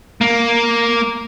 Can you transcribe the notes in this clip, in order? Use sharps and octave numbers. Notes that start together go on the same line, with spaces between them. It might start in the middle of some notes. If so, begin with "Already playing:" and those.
A#3